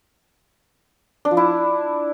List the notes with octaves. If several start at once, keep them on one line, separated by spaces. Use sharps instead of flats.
D4
F3
E4